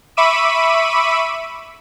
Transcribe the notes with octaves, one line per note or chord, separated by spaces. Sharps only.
E5 B5 C#6 D6 E6 D#7